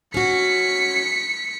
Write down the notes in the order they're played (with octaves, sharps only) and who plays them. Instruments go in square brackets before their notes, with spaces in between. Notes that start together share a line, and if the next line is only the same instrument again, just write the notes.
[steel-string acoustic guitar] C#4 F#4 [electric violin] B6 C#7